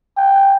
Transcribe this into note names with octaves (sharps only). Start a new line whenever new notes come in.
G5